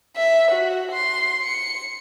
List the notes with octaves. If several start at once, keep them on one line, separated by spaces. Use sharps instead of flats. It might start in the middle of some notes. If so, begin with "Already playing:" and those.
E5
F#4
C6
C#7